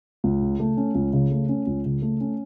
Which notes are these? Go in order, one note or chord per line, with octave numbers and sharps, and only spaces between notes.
C#2
C#3
A3
C#4
C#2
C#3
A3
C#4
C#2
C#3
A3
C#4